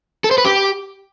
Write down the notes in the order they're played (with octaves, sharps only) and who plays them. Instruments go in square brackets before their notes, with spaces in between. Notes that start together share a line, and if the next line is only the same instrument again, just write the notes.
[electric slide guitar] A4
C5
B4
G4